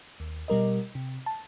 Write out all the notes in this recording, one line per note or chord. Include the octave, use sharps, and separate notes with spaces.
D#2
B2 G3 A#4 D#5
C3
A5